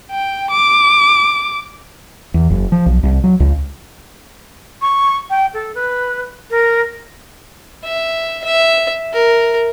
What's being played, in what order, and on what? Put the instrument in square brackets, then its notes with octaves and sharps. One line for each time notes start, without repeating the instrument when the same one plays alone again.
[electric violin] G5
D6
[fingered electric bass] E2
F#1
F3
B1
C2
F#3
C#2
[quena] C#6
G5
A4
B4
A#4
[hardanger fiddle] E5
E5
A#4